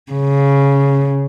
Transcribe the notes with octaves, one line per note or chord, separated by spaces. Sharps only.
C#3